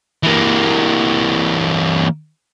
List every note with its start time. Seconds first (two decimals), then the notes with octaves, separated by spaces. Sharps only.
0.23 E3 A#3